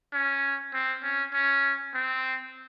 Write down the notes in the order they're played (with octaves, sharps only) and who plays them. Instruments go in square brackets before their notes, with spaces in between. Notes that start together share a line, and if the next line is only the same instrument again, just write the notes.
[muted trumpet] C#4
C4
C#4
C#4
C4